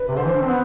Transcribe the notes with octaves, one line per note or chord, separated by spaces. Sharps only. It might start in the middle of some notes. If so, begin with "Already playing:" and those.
Already playing: B4
C3
D3 C5
E3
D4
C4
B3